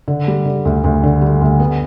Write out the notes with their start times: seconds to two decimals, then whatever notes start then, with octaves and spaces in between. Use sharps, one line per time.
0.08 D3
0.27 G3
0.46 D3
0.65 D2
0.84 D2
1.03 D3
1.22 G3
1.41 D2
1.60 B3